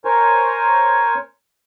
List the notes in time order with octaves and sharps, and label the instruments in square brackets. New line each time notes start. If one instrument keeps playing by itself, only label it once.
[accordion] A#4 C5 C#5 G#5